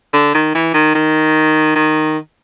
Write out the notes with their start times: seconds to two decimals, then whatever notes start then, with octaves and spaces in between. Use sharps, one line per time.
0.13 D3
0.34 D#3
0.55 E3
0.74 D#3
0.94 D#3
1.75 D#3